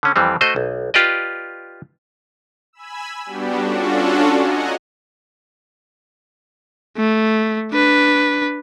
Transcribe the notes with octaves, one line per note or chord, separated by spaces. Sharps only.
D3 C#4
F2 E3 G3 C4
A3 F#4 C5 D#5
B1
F4 G4 B4 D5 D#5
G#5 B5 E6
G3 B3 D4 F#4 G4
C#4 D4 F4 F#4 A4
D#5 F#5 G#5 A#5
A3
D4 B4